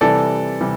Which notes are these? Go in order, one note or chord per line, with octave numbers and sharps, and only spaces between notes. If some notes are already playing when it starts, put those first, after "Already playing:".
C3 E3 G3 A4 D5
C3 E3 G3